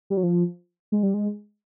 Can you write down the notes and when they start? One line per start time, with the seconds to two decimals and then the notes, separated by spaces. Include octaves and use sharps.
0.10 G3
0.17 F#3
0.23 F3
0.92 G#3
1.03 G3
1.14 G#3